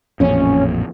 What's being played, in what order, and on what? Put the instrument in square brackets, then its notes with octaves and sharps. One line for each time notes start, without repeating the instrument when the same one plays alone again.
[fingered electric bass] A1 F2 A#2 [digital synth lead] C#4